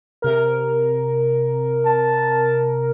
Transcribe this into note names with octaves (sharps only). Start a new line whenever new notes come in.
C3 A#4
A5